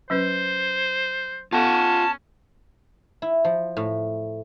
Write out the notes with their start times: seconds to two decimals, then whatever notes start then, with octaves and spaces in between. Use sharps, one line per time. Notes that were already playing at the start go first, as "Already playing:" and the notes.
0.10 F#3 C#4 B4 C5
1.52 B3 C#4 F4 A4 F#5 A5
3.22 E4
3.45 F3
3.77 A2